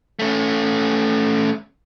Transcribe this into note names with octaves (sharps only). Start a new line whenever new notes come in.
A3 C#4